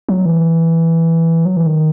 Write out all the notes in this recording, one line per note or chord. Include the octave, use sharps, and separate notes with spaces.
F#3
E3
F#3
E3
D#3